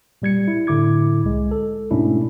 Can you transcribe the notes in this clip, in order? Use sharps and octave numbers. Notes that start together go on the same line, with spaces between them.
A#2 G3 G#6 C#7
E4
A2 D3 E4 D6 G#6
C2 G#3
A4
G#2 B2 A3 C#4 D4 E4